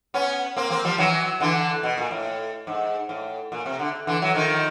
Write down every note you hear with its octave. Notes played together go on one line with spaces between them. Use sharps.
B3 C#4
A#3 C4
A#3 C4
F3 G3
E3 F#3
D3 E3
B2
A#2
A2
G#2
A2
A#2
C3
D3
D3 E3
E3 F#3
D#3 F3